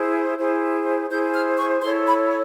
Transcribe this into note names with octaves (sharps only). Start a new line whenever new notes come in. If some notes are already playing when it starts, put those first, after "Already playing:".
Already playing: E4 G#4 C5
E4 G#4 C5
E4 G#4 C5 G6
F6
C#6
E4 A4 C#5 C6
B5